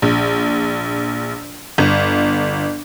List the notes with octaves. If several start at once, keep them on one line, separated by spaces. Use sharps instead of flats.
A#1
G1